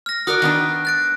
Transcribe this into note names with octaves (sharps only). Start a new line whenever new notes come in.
F6 A#6
F#4 A#4 D5 D#6 F#6
D#3 B3 D4
F#6 A6 D7